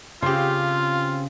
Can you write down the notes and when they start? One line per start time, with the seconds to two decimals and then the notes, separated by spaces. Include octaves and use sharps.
0.22 C#3 C4 F4 G4